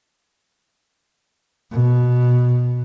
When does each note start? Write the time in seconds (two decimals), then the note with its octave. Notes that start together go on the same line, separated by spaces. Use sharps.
1.72 B2